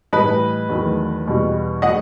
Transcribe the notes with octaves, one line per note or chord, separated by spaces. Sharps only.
A2 E3 G3 B4 D#5
E2 D#3 F#3 A3
E2 B2 G3
F#3 A3 D#5 F#5